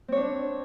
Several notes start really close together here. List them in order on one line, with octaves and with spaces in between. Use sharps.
C4 C#5 D4